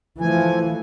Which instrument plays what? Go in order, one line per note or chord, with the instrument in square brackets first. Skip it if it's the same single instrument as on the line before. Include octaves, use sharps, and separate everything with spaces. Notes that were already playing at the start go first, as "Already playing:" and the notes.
[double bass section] E3 A3 [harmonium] F3 G#5